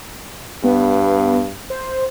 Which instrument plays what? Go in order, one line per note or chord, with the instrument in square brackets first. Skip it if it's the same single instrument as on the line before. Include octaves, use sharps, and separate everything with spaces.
[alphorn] G2 [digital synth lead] B3
[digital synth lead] C5